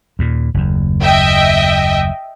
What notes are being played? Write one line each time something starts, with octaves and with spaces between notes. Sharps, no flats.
D#2 A#2
F#1 D#2
D#5 E5 G5